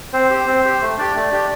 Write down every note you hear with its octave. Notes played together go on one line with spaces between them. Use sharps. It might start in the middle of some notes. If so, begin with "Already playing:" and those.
C4 C5
G4
C4
G4
A3
D4 G4 D5
A3
D4 G4